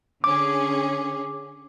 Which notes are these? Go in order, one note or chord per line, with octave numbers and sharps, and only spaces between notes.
D3 C#4 G#4 D6